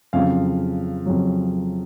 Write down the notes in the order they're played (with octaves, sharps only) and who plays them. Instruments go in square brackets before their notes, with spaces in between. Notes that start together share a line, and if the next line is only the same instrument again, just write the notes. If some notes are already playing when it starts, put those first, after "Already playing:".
[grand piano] F2 C#3 F#3 F5
F2 C#3 F#3